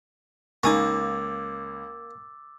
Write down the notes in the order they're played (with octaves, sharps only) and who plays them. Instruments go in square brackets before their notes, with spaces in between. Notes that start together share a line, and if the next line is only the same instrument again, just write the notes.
[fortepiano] C#2 [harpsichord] A#3 [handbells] D#4 G#5 C#6 [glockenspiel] D6 E6 A6